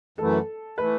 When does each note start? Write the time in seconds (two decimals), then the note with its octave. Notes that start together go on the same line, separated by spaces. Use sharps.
0.18 F#2 E3 A3 A4
0.78 E3 A3 B4